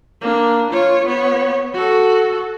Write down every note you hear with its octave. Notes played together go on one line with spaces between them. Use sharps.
A#3 D4
F4 C#5
B3 C#5
F#4 A4